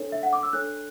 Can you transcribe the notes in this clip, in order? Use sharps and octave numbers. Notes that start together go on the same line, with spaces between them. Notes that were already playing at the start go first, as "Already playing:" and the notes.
Already playing: D4 A4 C#5
E5
F#5
D6
E6
D4 A4 C#5 F#6